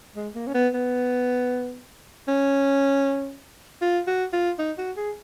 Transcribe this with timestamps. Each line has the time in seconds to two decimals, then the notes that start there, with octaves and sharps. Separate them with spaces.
0.16 G#3
0.35 A#3
0.47 C#4
0.54 B3
0.74 B3
2.28 C#4
3.81 F4
4.07 F#4
4.33 F4
4.59 D#4
4.78 F#4
4.97 G#4